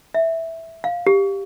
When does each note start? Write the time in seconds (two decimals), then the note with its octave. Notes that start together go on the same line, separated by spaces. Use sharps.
0.14 E5
0.84 F5
1.07 G4